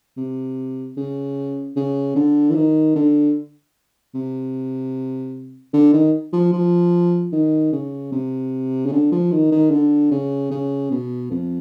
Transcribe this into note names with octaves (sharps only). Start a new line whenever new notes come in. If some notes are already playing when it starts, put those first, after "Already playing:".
C3
C#3
C#3
D3
E3
D#3
D3
C3
D3
D#3
F3
F3
D#3
C#3
C3
C#3
D3
F3
D#3
D#3
D3
C#3
C#3
B2
F2